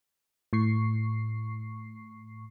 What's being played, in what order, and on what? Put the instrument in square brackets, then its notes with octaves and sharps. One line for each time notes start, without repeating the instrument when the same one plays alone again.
[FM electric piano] A2 C#6 C7